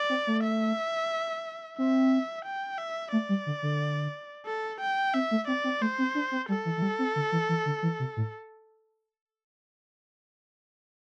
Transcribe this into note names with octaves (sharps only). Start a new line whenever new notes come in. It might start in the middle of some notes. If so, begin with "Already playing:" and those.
Already playing: D5
C4
A3
E5
C4 E5
G5
E5
A3 D5
G3
D3
D3
A4
G5
C4 E5
A3
C4 D5
C4
A3 C5
C4
D4
C4
G3 A4
E3
E3
G3
C4
D3
E3
E3
D3
E3
C3
A2